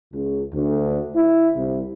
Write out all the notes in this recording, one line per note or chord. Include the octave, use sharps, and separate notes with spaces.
C#2
D2
E4
C2